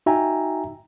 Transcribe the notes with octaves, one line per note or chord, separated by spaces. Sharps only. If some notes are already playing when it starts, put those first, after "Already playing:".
D#4 F#4 E5 G5 G#5 A#5